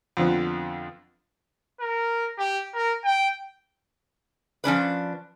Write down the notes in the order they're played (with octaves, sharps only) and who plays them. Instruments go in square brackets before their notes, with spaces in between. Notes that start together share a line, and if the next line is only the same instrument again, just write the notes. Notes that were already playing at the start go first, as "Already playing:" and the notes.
[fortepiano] F2 D3 F3 B3
[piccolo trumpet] A#4
G4
A#4
G5
[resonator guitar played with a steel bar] F3 C#4 D4 B4